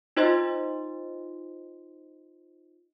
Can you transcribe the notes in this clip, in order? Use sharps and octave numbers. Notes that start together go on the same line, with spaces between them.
D#4 F4 C5 D#5 C6 A6